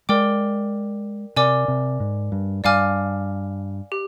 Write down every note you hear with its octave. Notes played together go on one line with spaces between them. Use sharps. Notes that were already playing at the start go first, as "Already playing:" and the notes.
G#3 A#4 D5 G5 D6
C3 A#4 D5 G#5 D6
C3
G#2
G2
G2 D5 F5 G#5 D6 F6
G4